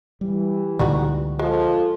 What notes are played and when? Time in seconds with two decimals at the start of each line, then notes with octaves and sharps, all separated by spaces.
0.21 E3 G3 G4
0.79 C#2 A#2 D3 G3 D#4 F#4
1.39 F3 G#3 A4